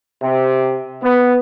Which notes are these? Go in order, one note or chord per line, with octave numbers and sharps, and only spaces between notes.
C3
B3